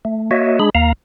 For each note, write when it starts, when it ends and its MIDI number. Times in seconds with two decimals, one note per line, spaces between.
0.05 0.30 57
0.31 0.59 58
0.31 0.59 66
0.31 0.59 73
0.31 0.59 75
0.31 0.59 76
0.60 0.70 56
0.60 0.70 62
0.60 0.70 68
0.60 0.70 83
0.75 0.93 39
0.75 0.93 58
0.75 0.93 77
0.75 0.93 82